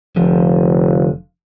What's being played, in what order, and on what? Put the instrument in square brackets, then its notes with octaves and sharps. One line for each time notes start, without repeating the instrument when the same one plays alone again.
[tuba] F1 [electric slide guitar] D3 F3